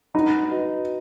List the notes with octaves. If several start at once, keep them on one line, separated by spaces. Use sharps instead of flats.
D#4 F#4 B4 F#5 B5
F#4 B4 D#5